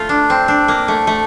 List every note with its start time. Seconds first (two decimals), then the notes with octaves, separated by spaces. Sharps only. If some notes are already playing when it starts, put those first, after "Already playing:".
Already playing: A3 F4
0.09 D4
0.30 C4
0.48 D4
0.68 A#3
0.88 A3
1.07 A3